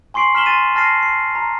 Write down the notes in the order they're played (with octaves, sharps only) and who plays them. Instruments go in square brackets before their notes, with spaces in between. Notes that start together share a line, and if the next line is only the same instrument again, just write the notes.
[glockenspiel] G#5 C6 C#6 C7 D7 F#7
A#5 F6 B6 E7 F#7 G7
G#5 C6 A6 D#7
A5 F6 A6 A#6 C7 D#7
C7
A#5